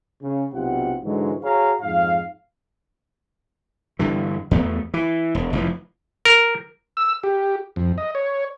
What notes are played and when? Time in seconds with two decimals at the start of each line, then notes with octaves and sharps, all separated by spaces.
0.22 C#3
0.53 B1 C3 F4 F#5
1.03 G#2 D3 E3 F#3 G#3
1.43 F#4 G#4 C#5 F5 A#5
1.81 F2 G#2 F5
3.99 G2 D3 E3
4.51 E2 A3 B3
4.94 E3
5.35 E1
5.53 F1 E3 F3
6.25 A#4
6.97 E6
7.23 G4
7.76 F2
7.98 D#5
8.15 C#5